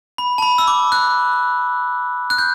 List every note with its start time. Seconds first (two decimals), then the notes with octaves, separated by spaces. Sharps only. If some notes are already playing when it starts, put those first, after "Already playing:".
0.18 B5
0.38 A5
0.42 B5
0.58 E6
0.67 D6
0.92 F#6
2.30 F#6
2.38 G6